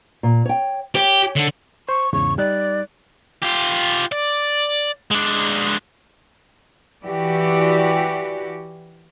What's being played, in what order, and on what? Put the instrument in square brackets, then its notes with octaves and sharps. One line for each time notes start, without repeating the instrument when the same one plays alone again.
[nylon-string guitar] A#2
C#5 G5
[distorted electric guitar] G4 [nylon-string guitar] C#5
[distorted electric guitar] D3
[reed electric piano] C5 [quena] C#6
[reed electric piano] E2 G#2 C#3 [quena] C#6
[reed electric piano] G3 D#4 F#6 [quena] D5
[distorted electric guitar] F4 G4
D5
G#3 D4
[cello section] E3 F#4 G4 D5